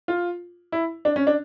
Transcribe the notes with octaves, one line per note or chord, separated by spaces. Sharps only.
F4
E4
D4
C#4
D4